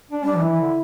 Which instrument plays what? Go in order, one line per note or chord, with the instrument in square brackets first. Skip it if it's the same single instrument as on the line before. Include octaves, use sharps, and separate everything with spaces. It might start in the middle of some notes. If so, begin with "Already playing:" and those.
[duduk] D4
[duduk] G3 [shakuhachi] D4
[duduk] E3
[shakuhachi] E4
[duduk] E3
D3